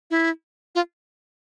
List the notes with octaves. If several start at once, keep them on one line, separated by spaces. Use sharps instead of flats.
E4
F4